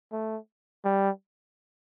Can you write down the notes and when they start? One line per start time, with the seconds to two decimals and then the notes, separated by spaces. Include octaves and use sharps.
0.12 A3
0.84 G3